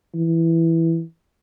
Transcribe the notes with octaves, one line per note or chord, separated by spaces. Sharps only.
E3